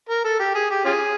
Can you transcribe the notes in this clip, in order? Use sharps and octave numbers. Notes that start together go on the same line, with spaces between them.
A#4
A4
G4
G#4
G4
C#4 F4 G#4